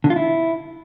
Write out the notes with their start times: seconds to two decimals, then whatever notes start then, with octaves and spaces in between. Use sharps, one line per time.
0.04 D3
0.10 F4
0.16 E4